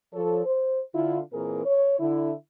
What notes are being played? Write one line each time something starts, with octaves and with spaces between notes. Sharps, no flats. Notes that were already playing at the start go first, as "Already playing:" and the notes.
F3 A4 C#5
C5
D3 E4 F4
A#2 E3 C4 G#4 A#4
C#5
D3 E4